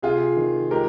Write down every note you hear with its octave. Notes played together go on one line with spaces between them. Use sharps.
C3 F4 G#4
D#3
G#3 G4 A#4